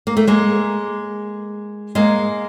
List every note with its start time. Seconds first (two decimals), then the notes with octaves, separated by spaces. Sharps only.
0.07 A#3
0.17 A3
0.27 G#3 A#3
1.95 G#3 A#3